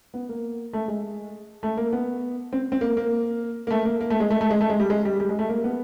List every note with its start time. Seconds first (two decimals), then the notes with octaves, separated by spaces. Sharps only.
0.14 B3
0.29 A#3
0.73 A3
0.88 G#3
1.63 A3
1.77 A#3
1.93 B3
2.53 C4
2.72 C4
2.81 A#3
2.97 A#3
3.67 A#3
3.71 A3
3.85 A#3
4.01 A#3
4.10 A3
4.20 G#3
4.30 A3
4.41 A3
4.50 G#3
4.61 A3
4.70 G#3
4.80 G3
4.90 G#3
5.05 G3
5.20 G3
5.29 G#3
5.39 A3
5.49 A#3
5.64 B3